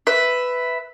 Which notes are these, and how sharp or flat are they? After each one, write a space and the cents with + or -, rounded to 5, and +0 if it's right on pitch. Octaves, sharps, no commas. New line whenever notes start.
B4 +10 E5 +0